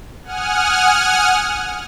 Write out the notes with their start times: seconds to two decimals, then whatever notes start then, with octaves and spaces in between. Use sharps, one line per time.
0.24 F#5 G#5 D#6 F6